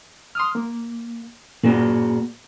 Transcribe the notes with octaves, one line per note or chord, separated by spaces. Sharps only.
C6 D#6 F6
A#3
A#2 A#3 F#4 G#4